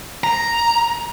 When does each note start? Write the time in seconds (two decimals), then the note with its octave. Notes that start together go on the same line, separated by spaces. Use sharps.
0.24 A#5